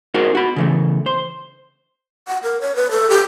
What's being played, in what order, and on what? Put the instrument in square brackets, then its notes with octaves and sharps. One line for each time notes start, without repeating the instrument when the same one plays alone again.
[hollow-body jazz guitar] D#4 F#4 G#4 A#4 C5
F#4 B5
C#3 E3 A3
C5
[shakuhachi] F#5
A#4
C#5
B4
A4
G4